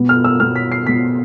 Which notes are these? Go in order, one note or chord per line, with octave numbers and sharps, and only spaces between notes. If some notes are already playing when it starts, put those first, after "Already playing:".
Already playing: B2 B3
F6
E6
B2 B3 F6
B6
C7
B2 B3 B6